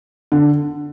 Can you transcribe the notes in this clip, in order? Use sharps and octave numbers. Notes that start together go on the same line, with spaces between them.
D3